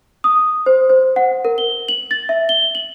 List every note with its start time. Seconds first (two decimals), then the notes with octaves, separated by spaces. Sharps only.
0.24 D#6
0.66 C5
0.89 C5
1.16 F#5
1.45 A#4
1.58 G7
1.89 F#7
2.11 A6
2.29 E5
2.49 G7
2.75 F#7